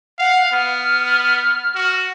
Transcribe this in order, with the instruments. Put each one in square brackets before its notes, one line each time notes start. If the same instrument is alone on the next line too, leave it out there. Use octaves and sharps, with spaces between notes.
[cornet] F5 [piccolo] F#5
[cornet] B3 [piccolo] F6
[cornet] F#4